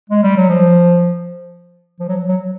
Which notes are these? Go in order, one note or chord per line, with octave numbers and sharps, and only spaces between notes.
G#3
G3
F#3
F3
F3
F#3
F#3